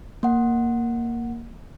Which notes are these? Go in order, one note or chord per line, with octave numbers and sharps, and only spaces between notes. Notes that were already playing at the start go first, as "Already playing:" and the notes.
A#3 F#5